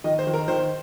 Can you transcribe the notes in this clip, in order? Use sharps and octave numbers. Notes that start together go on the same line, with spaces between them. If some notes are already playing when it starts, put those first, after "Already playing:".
D#3 D#5
C5
D#3
A#4
D#3 C5